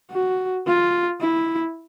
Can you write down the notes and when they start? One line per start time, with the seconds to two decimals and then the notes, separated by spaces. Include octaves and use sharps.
0.11 F#4
0.67 F4
1.21 E4